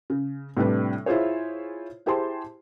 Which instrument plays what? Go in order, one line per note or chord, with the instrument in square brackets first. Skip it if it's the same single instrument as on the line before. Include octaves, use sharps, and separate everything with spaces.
[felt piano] C#3
A2 C3 G3 D4 B4
E4 F4 G#4 C5 C#5
E4 G4 G#4 C5 A5 C6